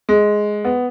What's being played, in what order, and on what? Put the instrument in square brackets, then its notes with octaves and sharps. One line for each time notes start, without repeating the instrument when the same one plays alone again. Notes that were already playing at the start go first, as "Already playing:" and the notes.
[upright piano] G#3
B3